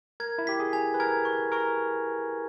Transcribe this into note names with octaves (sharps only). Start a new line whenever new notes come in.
A#4 G#6
E4
G4 B6
G#4
G#5
B4
A#4 G#6
C#6
A#4 C#6